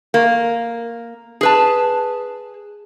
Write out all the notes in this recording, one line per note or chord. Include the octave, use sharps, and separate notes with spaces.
A#3
G#4 B4 A5